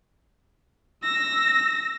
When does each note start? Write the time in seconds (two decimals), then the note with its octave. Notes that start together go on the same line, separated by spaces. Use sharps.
1.03 E6 A#6